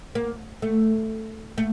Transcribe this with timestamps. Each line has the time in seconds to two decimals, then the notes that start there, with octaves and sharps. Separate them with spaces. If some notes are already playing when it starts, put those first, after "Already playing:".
0.15 A#3
0.62 A3
1.58 A3